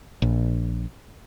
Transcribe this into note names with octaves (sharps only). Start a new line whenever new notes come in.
A#1